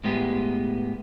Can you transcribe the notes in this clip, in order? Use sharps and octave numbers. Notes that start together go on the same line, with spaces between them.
A2 G#3 B3 G4